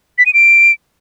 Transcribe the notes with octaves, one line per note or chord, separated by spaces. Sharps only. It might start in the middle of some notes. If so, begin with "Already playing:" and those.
B6
D#7
D7